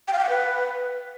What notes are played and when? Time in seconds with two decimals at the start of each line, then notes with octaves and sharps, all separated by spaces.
0.08 G5
0.13 F5
0.19 G5
0.24 F#5
0.29 B4